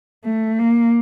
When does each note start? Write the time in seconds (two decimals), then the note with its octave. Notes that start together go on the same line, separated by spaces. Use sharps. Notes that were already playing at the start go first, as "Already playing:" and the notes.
0.25 A3
0.59 A#3